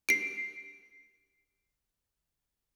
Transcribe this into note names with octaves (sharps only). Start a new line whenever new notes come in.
C7 D7